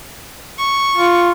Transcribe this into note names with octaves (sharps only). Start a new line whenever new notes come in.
C#6
F4